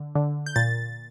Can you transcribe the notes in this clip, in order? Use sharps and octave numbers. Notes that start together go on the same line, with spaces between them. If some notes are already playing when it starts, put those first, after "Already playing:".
Already playing: D3
D3
G6
A#2 A6